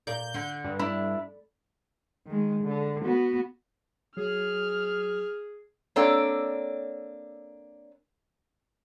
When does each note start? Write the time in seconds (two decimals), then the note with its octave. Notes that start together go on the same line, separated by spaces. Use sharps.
0.07 A#2 A#4 D5 G6
0.34 D3
0.64 G2
0.79 D4 E4
2.27 D#3 G#3
2.64 D3
3.03 B3 F#4
4.17 F#3 G#4 F6
5.96 A#3 C4 D4 A4 C#5 D5